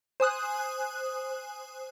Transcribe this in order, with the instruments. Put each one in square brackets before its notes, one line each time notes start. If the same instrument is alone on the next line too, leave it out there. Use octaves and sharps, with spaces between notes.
[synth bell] C5 G#5 D#6 F#6